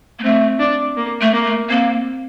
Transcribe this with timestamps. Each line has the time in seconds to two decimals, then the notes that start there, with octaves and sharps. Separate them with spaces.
0.19 A#3
0.23 A3 C4
0.59 D4
0.97 A#3
1.21 A3
1.33 A#3
1.45 A3
1.69 A#3 C4